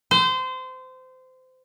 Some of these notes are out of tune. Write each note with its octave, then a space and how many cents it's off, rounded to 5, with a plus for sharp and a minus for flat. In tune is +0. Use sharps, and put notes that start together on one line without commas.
C5 -25